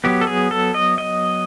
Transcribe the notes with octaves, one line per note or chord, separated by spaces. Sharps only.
F#3 B3 G4
A4
G#4
A4
D#5
D#5